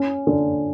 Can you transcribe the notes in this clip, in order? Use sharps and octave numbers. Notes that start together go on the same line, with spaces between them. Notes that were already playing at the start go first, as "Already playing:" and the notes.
Already playing: C#4
D3